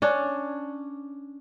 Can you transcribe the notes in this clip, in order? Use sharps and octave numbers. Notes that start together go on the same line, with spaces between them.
C#4 D4